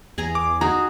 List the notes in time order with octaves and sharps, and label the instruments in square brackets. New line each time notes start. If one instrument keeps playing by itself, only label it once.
[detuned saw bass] E2 [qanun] G#4 G#5 A#5
[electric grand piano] D6
[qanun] D#4 F#4 G#4 [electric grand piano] A#5 [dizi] D#6